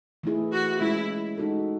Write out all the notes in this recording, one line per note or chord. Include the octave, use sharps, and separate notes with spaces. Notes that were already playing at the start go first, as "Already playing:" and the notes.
E3 A3 E4 G#4
F#4
G#3 C#4 E4 G#4
G#3 D#4 F#4 A4